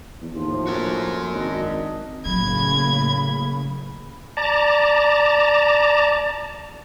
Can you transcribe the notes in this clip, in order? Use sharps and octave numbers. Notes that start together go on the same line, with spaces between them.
E2
D#2 A2 F3 F4
A#1 F#4 A#4
G#1 D4 D#5
A2 C#3 F#3 A#3 B5 G#6
D5 A5 A#5